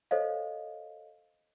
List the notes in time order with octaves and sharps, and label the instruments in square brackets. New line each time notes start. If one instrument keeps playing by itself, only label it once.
[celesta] A4 C5 C#5 D#5 F5